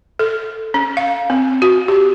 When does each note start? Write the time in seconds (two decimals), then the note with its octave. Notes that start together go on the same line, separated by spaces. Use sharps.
0.19 A4
0.74 C#4
0.97 F5
1.30 C4
1.62 F#4
1.88 G4